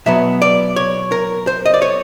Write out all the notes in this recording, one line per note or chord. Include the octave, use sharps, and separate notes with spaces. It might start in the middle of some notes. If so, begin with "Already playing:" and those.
B2 F#3 B3 E5
D5
C#5
A#4
C5
D#5
D5
C#5